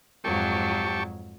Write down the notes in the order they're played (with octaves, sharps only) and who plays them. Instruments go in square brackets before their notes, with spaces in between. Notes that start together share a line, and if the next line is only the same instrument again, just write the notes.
[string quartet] F2 G#2 F#3 [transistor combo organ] G4 A5 C#6